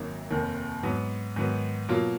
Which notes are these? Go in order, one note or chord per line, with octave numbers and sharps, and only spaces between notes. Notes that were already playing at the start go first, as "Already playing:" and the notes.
Already playing: G#1 F#2 D#3 F#3 A#3
F1 D#2 D#3
G#2 F#3 B3
G#2 D#3 F#3 B3
B2 F#3 A#3 F4